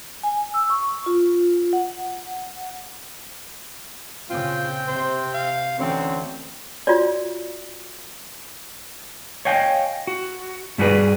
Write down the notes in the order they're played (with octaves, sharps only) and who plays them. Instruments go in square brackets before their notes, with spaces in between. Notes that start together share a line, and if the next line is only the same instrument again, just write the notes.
[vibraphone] G#5
E6
C#6
F4
F#5
[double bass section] A#2 C#3 [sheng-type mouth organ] C4 G5 [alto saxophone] F4
[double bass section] C3 [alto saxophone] C5
[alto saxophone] F5
[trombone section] D2 C4 [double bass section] E3 [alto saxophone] C#4
[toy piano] F4 F#4 C#5 D5
[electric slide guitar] C#5 D#5 F5 G5 G#5
F#4
G2 G3 F#4 G#4 B4 D5